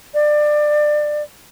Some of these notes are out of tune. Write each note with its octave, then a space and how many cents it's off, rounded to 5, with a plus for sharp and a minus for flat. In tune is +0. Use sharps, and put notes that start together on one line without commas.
D5 +25